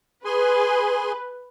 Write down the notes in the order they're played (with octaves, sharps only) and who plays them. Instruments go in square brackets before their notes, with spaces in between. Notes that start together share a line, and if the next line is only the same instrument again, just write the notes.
[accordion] G#4 G#5 C6 [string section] B4